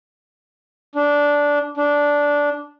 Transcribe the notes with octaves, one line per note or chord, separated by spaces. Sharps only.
D4
D4